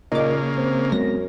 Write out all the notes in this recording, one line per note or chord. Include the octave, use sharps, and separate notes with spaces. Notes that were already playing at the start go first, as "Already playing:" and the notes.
A#2 C#3 A#3 D#4 D6
C4
F#2 G#3 B3 C4 A#6